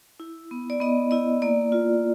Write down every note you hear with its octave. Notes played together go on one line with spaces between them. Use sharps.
E4
B3
D5
B3 D#5
E4 D#5
A#3 D5
F4